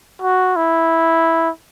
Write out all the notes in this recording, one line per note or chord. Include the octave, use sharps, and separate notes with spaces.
F#4
E4